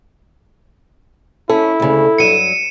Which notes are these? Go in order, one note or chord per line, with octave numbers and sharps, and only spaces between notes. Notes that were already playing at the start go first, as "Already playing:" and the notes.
C#4 E4 A4
D2 C#3
G2 F#3 C#7 D#7 E7